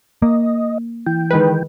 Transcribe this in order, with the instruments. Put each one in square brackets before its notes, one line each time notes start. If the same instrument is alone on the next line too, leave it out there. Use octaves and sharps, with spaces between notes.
[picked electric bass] A#3 [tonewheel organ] D#5
[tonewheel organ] E3 G5
[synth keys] D#3 G#3 B4